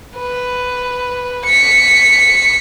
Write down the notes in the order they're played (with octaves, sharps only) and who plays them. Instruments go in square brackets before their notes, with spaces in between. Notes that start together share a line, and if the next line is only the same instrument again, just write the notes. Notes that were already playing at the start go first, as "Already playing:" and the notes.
[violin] B4
B6 C#7